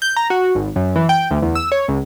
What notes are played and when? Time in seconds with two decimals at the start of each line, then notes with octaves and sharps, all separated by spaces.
0.02 G6
0.16 A#5
0.30 F#4
0.55 G#1
0.76 F#2
0.96 E3
1.09 G5
1.31 D2
1.42 E2
1.55 E6
1.72 C#5
1.88 C#2